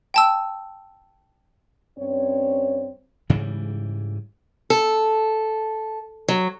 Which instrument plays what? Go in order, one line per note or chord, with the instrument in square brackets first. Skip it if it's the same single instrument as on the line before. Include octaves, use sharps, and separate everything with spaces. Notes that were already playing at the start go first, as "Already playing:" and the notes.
[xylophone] G5 A5 E6
[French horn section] G2 C4 C#4 C#5
[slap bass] G#2 C#3 E3 G3
[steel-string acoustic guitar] A4
F#3